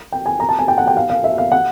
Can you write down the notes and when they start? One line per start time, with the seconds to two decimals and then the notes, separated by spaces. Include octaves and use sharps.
0.12 G5
0.26 G#5
0.40 A#5
0.49 A5
0.59 G#5
0.68 G5
0.78 F#5
0.87 G5
0.97 F5
1.10 F5
1.24 E5
1.38 F5
1.52 F#5